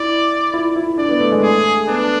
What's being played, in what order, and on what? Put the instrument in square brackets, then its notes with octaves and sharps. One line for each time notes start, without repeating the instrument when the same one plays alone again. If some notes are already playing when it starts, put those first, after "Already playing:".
Already playing: [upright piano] E4 [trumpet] D5
[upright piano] E4
E4
[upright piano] D4 [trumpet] D5
[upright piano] B3
A3
G#3
[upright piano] A3 [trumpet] G#4
[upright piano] B3 [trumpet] D4